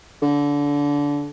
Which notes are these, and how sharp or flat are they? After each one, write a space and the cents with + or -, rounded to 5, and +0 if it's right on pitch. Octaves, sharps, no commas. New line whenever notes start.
D3 -25